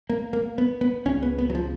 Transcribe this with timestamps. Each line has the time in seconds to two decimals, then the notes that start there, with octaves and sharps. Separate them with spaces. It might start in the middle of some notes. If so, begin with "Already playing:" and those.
0.09 A#3
0.33 A#3
0.58 B3
0.81 B3
1.05 C#2 C#3 C#4
1.23 B3
1.38 B3
1.50 F#3
1.55 F3